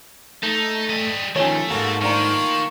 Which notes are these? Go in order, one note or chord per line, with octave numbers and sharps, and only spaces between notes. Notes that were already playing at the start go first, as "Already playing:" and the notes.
A3 D#4
G3 D#5
D#3 F3 A3 C#4 G4 C#5
D#2 G#2 A#3 F#4 A4
D#3 A3 A#3 D4 F4 A#5 C#6